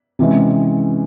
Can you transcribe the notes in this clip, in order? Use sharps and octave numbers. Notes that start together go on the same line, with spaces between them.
C3 E3 G#3 C#4